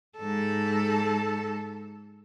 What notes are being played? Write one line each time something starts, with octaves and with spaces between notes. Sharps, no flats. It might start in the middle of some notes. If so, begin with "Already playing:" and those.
G#2 A4